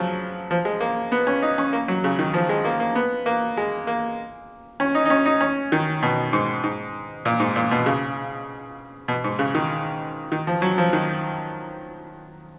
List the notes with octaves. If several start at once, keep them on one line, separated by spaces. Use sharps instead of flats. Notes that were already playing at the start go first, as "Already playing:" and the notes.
Already playing: C#3 F3 F#3
F3
G#3
A#3
B3
C#4
D#4
C#4
A#3
F#3
C#3
D#3
F3
G#3
A#3
A#3
B3
A#3
G#3
A#3
C#4
D#4
D#4
C#4
D#4
C#4
D#3
B2
G#2
G#2
A#2
G#2
A#2
B2
C#3
B2
G#2
C#3
D#3
D#3
F3
F#3
F3
D#3